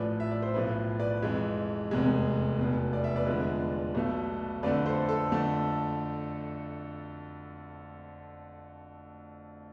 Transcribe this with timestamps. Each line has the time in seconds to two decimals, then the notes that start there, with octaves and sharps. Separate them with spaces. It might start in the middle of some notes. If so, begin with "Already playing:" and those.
Already playing: A1 A2 F3 B4 D5
0.20 E5
0.31 D5
0.42 C5
0.54 B1 A2 F3 B4
1.00 B4 D5
1.22 F2 E3 G#3
1.91 F1 E2 C3 G#3
2.59 F1 E2 B2
2.93 D5
3.04 E5
3.16 B4 D5
3.26 E2 D3 F3 G#3
3.95 B1 B2 A3
4.63 F2 D3 A3 B4 D5
4.86 A4 C5
5.09 A4
5.32 F2 D3 A3